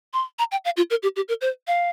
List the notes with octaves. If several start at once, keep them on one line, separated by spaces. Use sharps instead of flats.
C6
A#5
G5
F5
F4
A#4
G4
G4
A#4
C5
F5